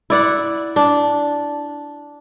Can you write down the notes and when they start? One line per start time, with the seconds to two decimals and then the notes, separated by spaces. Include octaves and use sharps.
0.10 E4 D5 F#5
0.76 D4